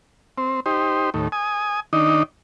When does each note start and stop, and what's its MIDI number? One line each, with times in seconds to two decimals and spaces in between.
0.38 0.60 60
0.66 1.10 63
0.66 1.10 67
0.66 1.10 72
1.14 1.28 39
1.14 1.28 45
1.32 1.80 80
1.32 1.80 87
1.93 2.23 51
1.93 2.23 62
1.93 2.23 63